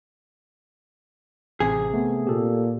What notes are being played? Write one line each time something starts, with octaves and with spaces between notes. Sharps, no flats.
A1 C3 G#4
A3 B3
A#2 G4 A4